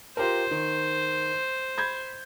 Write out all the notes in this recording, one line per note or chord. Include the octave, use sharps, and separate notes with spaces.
F4 G4 A#4 C5
D#3
B5 G6 G#6